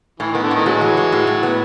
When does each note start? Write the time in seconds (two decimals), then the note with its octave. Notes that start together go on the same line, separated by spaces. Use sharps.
0.20 A2 E3
0.32 D#3 B3
0.43 D3
0.51 A2 D#3
0.66 F#3 G#3
0.81 E3
0.97 G#3
1.12 A2
1.27 A2
1.43 B3